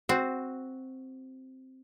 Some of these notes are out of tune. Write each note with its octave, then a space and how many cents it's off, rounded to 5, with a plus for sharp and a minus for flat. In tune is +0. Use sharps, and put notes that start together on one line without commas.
C4 +0 F#4 +0